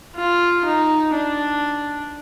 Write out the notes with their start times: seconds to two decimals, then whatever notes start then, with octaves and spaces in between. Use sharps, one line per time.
0.16 F4
0.65 D#4
1.14 D4